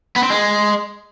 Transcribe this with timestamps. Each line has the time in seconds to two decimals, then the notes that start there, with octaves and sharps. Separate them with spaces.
0.16 B3
0.23 C4
0.30 G#3